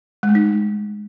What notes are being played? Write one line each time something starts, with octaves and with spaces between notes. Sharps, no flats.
G#3
A3
D#4